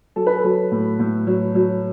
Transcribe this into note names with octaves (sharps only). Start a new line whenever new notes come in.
F#3 A4
B4
A4
F#3
A2
A2
F#3
F#3